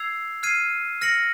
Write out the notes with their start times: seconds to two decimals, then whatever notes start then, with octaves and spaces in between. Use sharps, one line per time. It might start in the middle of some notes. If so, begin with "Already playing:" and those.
Already playing: E6 G#6 C7 F7
0.43 F6 G#6 C7 D#7
1.01 F6 A#6 C#7 F#7